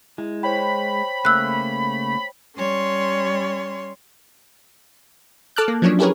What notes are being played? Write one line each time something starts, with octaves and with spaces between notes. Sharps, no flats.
G#3 E4
C5 C#5 G5 B5
C#3 A3 A#3 E6 F#6
G3 C#4 C#5 C6
A4 A5 D6 F6 F#6
A#3
F3 F#3 C#4 D4 C#5
E4 G4 G#4 A#4 B4 C#5